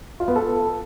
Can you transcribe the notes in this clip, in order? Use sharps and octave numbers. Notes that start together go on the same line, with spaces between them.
F4
B3
A4